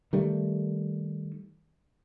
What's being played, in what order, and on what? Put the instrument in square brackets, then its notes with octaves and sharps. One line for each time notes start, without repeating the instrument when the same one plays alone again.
[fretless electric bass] D#3 G3 A3